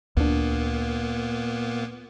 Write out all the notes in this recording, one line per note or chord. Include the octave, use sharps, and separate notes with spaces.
D2 A#2 A#3 B3 D4